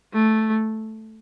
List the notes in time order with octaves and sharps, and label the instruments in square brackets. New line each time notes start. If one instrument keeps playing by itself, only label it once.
[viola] A3